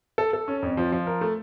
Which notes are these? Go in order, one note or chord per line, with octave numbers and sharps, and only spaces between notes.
A4
A4
C#4
F2
F3
F3
A#4
A3